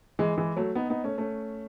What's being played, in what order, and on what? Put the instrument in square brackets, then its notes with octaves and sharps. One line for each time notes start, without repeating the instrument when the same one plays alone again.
[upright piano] E3 G#3
E3 G#3
F#3 A3
B3 D#4
B3 D#4
A3 C#4
A3 C#4